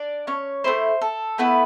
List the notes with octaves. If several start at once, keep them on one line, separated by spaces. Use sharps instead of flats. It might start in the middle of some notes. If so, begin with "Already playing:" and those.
Already playing: D4 D5
C#4 C#5
A3 C4 E4 C5
A4
A3 B3 E4 B4